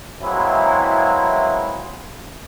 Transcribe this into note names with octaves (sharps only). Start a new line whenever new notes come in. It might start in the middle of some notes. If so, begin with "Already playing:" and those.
E3 F#3 G#3 A#3 C4 E4